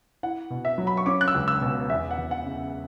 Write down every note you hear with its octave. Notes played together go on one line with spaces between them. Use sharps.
E4 F#5
B2
E5
F#3
B5
C#6
C#4 D6
F#6
E6
C#2
E6
B2
E2 E5
F#5
E2
F#5
C#3